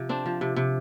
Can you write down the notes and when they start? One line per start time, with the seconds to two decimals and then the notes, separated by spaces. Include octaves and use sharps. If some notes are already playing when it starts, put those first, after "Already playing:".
Already playing: C3 F3
0.09 C4 D4
0.26 F3
0.41 C3
0.56 C3